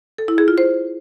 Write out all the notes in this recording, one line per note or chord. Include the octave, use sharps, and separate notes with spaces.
A4
E4
G#4
F4
C5